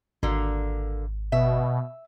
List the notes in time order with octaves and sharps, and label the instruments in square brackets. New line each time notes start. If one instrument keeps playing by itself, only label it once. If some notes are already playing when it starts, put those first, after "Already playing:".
[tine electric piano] G#1 [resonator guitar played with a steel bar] D3 A#3
[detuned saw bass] B2 [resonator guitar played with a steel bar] E5